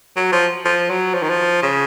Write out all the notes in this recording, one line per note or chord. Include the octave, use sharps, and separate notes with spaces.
F#3
F3
F3
F#3
F3
D#3
F3
C#3